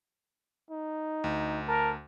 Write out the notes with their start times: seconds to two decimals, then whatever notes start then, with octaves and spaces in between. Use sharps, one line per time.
0.71 D#4
1.24 D2
1.68 A#4 A5